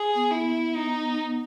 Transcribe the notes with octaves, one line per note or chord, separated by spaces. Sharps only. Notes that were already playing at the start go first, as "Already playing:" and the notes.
Already playing: G#4
B3
E4
B3
D#4